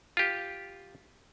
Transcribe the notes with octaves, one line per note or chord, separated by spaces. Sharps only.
F4 G4